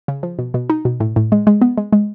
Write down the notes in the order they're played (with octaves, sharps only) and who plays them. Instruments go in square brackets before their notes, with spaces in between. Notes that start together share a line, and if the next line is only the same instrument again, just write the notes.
[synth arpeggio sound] C#3
F3
B2
B2
D#4
B2
A2
A2
G#3
G#3
B3
G#3
G#3